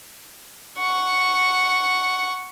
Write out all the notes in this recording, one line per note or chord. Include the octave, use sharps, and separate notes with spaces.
F#5 C#6